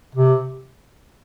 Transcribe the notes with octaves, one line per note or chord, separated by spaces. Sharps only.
C3